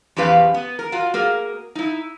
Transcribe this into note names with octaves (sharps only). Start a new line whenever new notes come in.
E2 F3 C#4 G4 B4 F5
B3
A#4
F4 F#4
A#3 G#4 A#4
D#4 E4